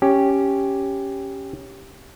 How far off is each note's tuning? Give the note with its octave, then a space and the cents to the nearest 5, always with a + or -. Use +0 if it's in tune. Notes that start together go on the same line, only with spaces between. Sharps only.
C#4 +0 G4 +0